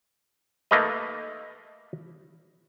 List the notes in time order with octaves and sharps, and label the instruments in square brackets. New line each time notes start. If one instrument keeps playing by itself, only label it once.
[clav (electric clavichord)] A3 A#3 D#4 B4 D#5